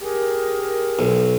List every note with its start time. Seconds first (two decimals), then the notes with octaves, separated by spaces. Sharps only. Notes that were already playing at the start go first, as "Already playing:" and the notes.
0.01 G4 G#4 A#4
0.99 B1